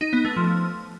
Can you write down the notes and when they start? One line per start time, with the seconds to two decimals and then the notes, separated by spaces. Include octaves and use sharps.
0.01 D#4
0.13 B3
0.25 A3
0.36 F3